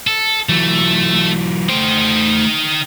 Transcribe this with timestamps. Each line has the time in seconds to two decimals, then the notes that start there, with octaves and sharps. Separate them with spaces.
0.07 A4
0.49 E3 F#3 A3
1.69 A3 D#4 C5 G5